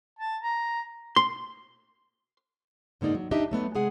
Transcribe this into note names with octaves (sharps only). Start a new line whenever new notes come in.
A5
A#5
C6
G#2 D3 A#3 D#4 D5
F#3
D4 D#4 G4 D#5 E5
F#3 A3 B3
C3 G#3 G#4 F#5